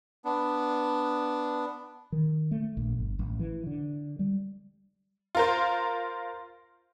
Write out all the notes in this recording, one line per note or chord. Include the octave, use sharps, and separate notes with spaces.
B3 D4
D#3
A3
A#1
G1
A1
E3
D3
G3
F4 A#4 C5